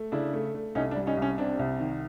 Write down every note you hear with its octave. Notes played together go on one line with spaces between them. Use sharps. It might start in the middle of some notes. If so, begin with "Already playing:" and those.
Already playing: A3
C#3 D4 E4
A3
A3
C2 C#4 D#4
D4
G3
C#4 D#4
C2 C#4
C3 D4
C2
D#3